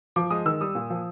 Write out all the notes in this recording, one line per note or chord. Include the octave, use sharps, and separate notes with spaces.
F3 D6
G#3 D#6
D#3 E6
G3 D#6
A#2
F3